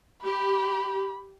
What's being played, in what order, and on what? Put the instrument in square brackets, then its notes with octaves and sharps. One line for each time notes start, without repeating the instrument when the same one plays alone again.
[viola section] G4 [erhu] B5